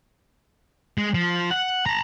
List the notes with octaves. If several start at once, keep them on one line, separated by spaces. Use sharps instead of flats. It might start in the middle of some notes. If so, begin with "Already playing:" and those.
G#3
F3
F#5
A5 A#5